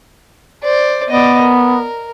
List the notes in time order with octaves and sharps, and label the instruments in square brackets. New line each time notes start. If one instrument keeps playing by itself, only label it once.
[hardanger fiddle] C5 D5
[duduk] B3 [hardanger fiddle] D5 D#5
[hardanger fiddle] A#4